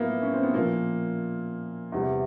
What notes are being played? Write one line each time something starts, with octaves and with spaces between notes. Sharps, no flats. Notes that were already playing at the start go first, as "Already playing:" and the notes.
Already playing: A2 F#3 A#3 B3 E4
C#4
C4
B3
A#2 F3 A#3
E2 C3 E3 G3